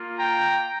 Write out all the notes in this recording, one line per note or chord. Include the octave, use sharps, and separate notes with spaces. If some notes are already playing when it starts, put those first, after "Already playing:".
Already playing: A#3 F4
G5 A#5